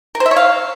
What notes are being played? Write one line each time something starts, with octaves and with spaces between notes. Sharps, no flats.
A#4
C5
E5
C#5
F5